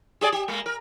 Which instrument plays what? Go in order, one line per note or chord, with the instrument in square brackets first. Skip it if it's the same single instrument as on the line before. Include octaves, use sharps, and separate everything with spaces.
[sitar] G4 G#4 D5
G4
G#3 A#3
A#4